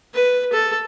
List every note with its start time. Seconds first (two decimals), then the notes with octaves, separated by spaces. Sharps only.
0.14 B4
0.53 A4